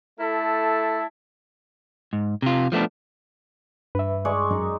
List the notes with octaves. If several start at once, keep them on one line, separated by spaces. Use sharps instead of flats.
A3 E4 A4 A5
G#2
C3 F4
F3 A3 B3 D4
G2 B4 E5
G#3 D5 C#6
F#2 D#4